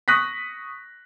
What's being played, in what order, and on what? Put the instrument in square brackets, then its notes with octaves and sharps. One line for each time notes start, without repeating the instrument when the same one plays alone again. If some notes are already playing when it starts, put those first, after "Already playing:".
[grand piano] C#6 D#6 F#6 A#6 B6